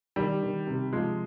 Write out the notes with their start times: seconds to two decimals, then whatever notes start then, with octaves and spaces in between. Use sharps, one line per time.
0.16 D#3 G3
0.42 D#3
0.67 C3
0.93 F3 G#3